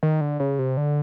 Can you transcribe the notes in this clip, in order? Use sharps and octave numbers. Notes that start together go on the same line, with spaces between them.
D#3
D3
C#3
C3
D3